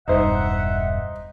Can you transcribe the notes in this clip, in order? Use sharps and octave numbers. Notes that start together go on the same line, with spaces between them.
E1 G2 D#4 C5 E5 F#5